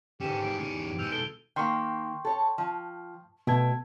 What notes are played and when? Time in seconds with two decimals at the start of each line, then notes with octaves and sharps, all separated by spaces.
0.20 G#1 D3 C#4 G4 D#7 E7
0.44 A2 G#4 G#6 D7
0.59 E2 C#4 G4
0.99 B2 G#3 E6 F6 G6 D#7 F7
1.12 A4 D7 G7
1.56 D#3 A#3 G5 C6 C#6
2.25 A4 C#5
2.58 F3
3.47 B2 A3 G5 G#6